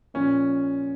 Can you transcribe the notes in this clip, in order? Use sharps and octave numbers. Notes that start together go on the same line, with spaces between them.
A#2 F3 C#4